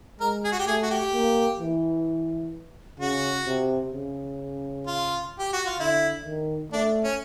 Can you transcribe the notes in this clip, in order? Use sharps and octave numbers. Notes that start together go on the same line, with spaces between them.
G#3 A#4
G#4
F#4
G4
A3 G#4
F#4
G4
A#3
E3
C#3 F#4
C3
C#3
F4
G4
F#4
F4
D3 E4
D#3
A3 D4
C#4